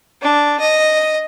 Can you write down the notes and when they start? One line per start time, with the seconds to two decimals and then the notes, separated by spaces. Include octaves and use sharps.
0.22 D4
0.60 D#5